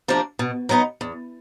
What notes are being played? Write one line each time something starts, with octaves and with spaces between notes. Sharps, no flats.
C3 F3 A#3 D4
B2
F#3 B3 D#4
E2